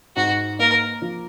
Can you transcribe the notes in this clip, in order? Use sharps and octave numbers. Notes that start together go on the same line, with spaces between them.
G#2 F#4
A#3 A#4
F3